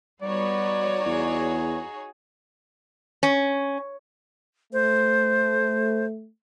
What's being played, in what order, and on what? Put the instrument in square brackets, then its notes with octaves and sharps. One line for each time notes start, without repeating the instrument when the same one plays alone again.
[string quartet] G3 B3 [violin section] D#4 F#4 C#5 [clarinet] D5
[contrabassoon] E2 [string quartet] G#4
[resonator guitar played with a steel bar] C#4
[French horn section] A3 [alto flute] C5